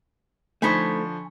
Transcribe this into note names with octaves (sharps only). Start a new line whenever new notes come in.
D3 F3 A3 D#4 C5 G#5 B5 C#6